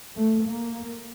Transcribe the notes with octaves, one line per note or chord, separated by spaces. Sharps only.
A3
A#3